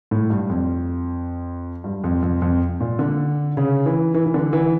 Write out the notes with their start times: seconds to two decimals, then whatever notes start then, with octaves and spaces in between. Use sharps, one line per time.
0.11 A2
0.30 G2
0.50 F2
1.84 G2
2.04 F2
2.22 F2
2.42 F2
2.80 A#2
2.99 D3
3.57 C#3
3.86 E3
4.14 E3
4.26 E3
4.34 D3
4.53 E3